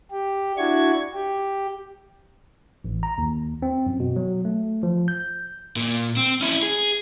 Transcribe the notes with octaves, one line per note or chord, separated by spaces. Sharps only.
G4
D4 E4 F#4 C#6 G#6
G4
A1
A#5
D#2
C4
F#2
B2
F#3
A3
F3
G6
A#2
C4
C#4 E4
G#4